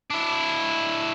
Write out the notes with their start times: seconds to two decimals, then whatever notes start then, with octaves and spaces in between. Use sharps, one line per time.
0.11 D4 E4